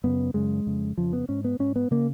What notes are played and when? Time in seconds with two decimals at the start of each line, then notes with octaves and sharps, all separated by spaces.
0.04 F#2 C#3 B3
0.34 F#2 C#3 G#3
0.66 F2 C#3
0.98 F2 C#3 F3
1.13 B3
1.29 G#2 C#4
1.44 B3
1.59 G#2 C#4
1.76 B3
1.91 C#3 A#3